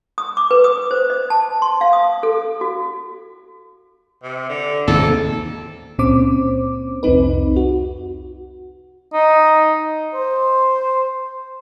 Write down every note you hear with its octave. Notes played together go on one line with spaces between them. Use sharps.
D#6
D6
B4
D#6
C5
D#5
A5
C6
F5
D#6
A4
F#4
C3
D3
D#2 G#2 C3 A4
C#2 A#2 C4 C#4 C5 D6
C2 F2 C4 D#4 B4
F#4
D#4
C5